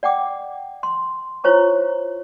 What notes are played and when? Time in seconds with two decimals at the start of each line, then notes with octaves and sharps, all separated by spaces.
0.03 D5 F#5 G5 D6
0.83 C6
1.44 E4 F4 C5 C#5 A#5 C#6